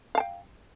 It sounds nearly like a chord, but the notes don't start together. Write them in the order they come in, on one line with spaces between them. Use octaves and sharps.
F5 A5 G5